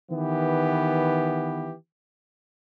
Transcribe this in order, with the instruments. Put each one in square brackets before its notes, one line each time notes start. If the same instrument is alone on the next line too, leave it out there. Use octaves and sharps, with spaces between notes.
[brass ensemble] D#3 E3 B3 G4